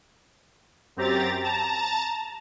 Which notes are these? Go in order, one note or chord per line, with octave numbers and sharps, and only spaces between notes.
F#2 C4 G4 A#5 A6
A5 A#5 A6